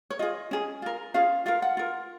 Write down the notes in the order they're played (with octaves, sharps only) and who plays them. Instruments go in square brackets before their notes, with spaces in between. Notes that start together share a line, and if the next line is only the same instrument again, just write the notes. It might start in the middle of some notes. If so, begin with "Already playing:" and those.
[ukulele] C#5
F4 G#4 D#5
C#4 G#4
F4 A#4
C#4 F4 G#4 F5
F4 A#4 F5
F#5
F4 A#4